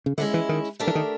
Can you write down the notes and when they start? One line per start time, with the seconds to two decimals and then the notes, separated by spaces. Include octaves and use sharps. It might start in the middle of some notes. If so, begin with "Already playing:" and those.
0.06 C#3
0.18 D3 G#3 C#4 E4
0.34 E3
0.49 D#3
0.80 A3 D4 G4 A#4
0.87 E3
0.95 D#3